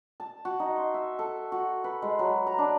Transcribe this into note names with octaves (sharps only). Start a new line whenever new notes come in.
A5
F#4
D#4
C6
E5
A4
F#4
B4
G#3
F#3
A#5
D4